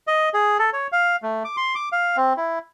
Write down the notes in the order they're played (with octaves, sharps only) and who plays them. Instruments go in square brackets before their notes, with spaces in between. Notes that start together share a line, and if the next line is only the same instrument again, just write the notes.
[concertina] D#5
G#4
A4
C#5
F5
A3
D6
C6
D6
F5
C4
E4